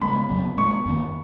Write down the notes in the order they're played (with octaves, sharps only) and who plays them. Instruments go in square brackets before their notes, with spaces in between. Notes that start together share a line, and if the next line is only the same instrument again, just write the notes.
[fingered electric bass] C#3 G#3 B3 [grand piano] B5
[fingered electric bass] F2 C#3 F#3 B3
[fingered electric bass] A#2 G#3 B3 [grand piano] C#6
[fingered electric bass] F2 D#3 A#3